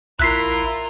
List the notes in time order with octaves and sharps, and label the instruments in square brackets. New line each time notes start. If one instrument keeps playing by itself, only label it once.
[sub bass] A#1 [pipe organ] E4 [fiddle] F4 A#4 [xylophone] F#6 B6 C7